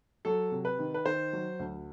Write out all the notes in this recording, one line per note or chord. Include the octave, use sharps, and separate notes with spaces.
F#3 A4
C3
B4
D#3
B4
D#3 C5
F#3
D2